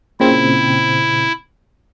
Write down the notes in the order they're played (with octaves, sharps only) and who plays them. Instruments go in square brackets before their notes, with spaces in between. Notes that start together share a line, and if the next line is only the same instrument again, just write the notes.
[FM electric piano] A#2 C#3 C4 [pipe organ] E4